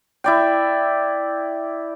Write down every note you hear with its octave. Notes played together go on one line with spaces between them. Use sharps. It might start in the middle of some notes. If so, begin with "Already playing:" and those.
E4 D5 G5